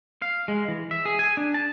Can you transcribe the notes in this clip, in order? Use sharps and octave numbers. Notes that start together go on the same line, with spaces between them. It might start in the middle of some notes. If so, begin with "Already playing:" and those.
F5
G#3
E3
E5
G#4
G#5
D4
A5